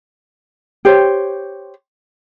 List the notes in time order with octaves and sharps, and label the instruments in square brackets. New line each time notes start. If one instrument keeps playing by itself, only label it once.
[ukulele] G4 C5 C#5